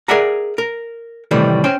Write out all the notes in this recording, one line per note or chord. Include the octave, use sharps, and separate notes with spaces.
G#4 A#4 D5 E5 F#5 A#5
A#4
A2 C3 D#3 E3 G3 A3
C#4 C5 G5